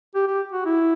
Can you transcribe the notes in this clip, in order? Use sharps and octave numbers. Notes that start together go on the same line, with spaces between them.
G4
G4
F#4
E4